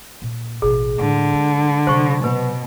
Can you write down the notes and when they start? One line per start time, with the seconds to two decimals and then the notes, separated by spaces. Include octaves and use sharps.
0.22 A#2
0.62 A1 B2 G#4
1.00 A2 D3 G#3
1.34 G#3
1.87 C3 F#3 C5 C#6
2.24 B2 B4